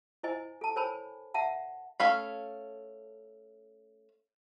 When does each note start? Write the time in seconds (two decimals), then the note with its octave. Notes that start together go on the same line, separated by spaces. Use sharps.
0.23 E4 C5 D#5 G#5
0.61 A4 A5
0.76 A#4 C5 C#5 G#5 A5 B5
1.34 E5 F#5 A5
2.00 A3 C#4 F5 B5